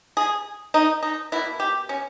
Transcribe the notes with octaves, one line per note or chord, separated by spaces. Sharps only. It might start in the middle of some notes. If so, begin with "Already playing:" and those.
G#4
D#4
D#4
B2 A#3 E4
G4
C#4